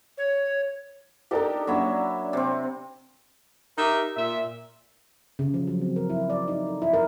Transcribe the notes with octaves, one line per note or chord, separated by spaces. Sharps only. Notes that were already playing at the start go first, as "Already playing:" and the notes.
C#5
D4 D#4 G4 A4 A#4
F#3 A#3 C#4 D4 E4 E5
C3 C4
D#4 G4 A#4 E5
A#2 E5
C#3
F3
F#3
C4
A#4
E4
D5
D#4
A4
E4
A#4